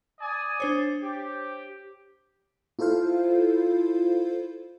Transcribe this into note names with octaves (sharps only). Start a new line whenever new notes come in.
D5 G#5 D#6
D4 C5 C#5
G4
E4 F4 A4 C5 F5